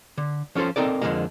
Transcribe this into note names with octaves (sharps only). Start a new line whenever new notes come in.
D3
F3 C#4 F4 A4 C5
C4 D#4 A4 A#4 D5
F2 D3 E3 F3 G#3 A#3